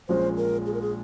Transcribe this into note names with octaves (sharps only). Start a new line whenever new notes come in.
A#1 A#2 G#3 C#4 F4 C5
A#4
G#4
A#4
G#4